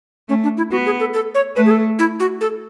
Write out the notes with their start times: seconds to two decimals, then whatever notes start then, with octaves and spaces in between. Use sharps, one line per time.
0.29 A3 C#4
0.43 D4
0.57 E4
0.71 B3 F#4
0.86 G#4
1.00 A4
1.14 A4
1.35 C#5
1.56 A3 B4
1.66 G#4
1.71 A4
1.99 E4
2.20 F#4
2.41 A4